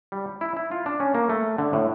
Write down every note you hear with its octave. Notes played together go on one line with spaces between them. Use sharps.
G3
E4
E4
F4
D4
C#4
A#3
A3
D3
A2